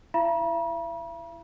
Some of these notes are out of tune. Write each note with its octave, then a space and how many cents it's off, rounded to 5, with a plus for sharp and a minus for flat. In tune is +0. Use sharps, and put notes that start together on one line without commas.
E4 +10 E5 +45 B5 -45